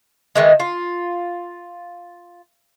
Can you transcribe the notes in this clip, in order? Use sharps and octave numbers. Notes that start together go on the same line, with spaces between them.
D#3 E3 G#3
F4